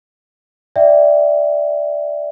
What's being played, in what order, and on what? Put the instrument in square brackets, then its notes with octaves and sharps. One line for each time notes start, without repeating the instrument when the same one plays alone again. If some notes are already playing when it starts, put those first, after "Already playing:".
[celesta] D5 E5 G5